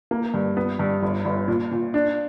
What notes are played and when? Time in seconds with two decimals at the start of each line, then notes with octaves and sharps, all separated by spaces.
0.11 A#3
0.34 G2
0.57 B3
0.79 G2
1.02 G1
1.25 G1
1.48 A#2
1.71 A#2
1.94 D4